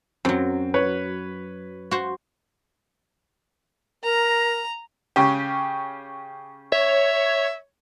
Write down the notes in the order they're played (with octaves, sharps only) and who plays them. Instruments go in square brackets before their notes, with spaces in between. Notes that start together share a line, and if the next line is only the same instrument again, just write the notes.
[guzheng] F#2 F#3 [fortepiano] C4
[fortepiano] B4 C#5
[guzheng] F#4 C5
[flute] A#4 [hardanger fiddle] A#5
[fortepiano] C#3 C#4 G4
[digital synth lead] C#5 [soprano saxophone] E5